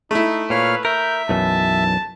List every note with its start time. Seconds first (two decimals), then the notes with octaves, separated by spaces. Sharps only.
0.11 A3 D#4 E4
0.50 A#2 B4 C#5 F5 F6
0.85 A#4 E5 G6
1.29 B1 F#2 E3 A5